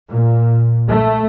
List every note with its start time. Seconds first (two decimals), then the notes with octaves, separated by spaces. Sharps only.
0.10 A#2
0.87 A3